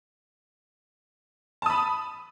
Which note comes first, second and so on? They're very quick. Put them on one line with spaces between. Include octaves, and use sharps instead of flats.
A5 D#6 B5